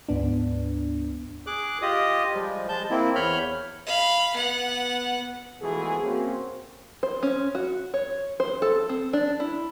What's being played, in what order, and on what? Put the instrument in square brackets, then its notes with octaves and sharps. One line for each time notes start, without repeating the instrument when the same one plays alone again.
[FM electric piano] D2 G#2 B3 D4
[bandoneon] G#4 D6 F#6
F4 G4 D#5 D#6
F3 G3 G#3
G#3 A5 G6
A#3 C4 E4
E2 C#5 B5 F6 G6
[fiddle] F5 B5
B3 F#5
[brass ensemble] B2 E3 F3 G#3 A3 G#4
A#3 C4 C#4 F#4
[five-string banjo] C5
C#4
F#4
C#5
C5
A4
C4
D4
E4